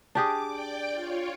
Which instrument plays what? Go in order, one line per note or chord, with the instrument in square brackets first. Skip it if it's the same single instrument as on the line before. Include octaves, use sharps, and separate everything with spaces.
[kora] D4 G4 G#4 [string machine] D6
[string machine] D5 G5 D6
F4 C#5